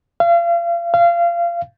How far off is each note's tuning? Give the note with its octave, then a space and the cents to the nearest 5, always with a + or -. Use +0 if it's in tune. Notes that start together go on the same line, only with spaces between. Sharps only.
F5 -35
F5 -25